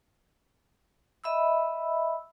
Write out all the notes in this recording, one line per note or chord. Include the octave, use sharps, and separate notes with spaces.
D#5 E5 B5 E6